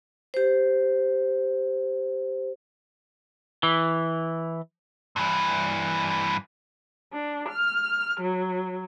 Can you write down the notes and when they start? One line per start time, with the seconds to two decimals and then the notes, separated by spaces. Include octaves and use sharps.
0.34 G4 C5
3.63 E3
5.16 G2 E3
7.12 D4
7.48 F6
8.22 F#3